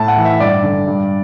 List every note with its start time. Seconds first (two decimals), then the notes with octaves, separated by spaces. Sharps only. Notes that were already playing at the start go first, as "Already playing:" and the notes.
Already playing: A2 A5
0.08 F#5
0.17 E3
0.25 E5
0.40 G2 D5
0.63 D3
0.87 G2